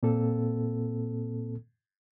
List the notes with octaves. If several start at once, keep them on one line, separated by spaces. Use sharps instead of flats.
A#2 A#3 C4 A4